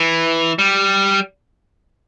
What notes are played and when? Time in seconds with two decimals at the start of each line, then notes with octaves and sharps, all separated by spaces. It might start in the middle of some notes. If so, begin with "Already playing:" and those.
Already playing: E3
0.59 G3